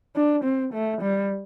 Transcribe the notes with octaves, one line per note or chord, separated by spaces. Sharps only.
D4
C4
A3
G3